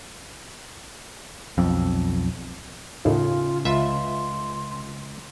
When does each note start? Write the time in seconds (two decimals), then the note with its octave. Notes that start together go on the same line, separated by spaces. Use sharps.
1.58 B1 F2
3.05 D#2 A2 C#3 F4
3.65 C#2 F4 E5 C6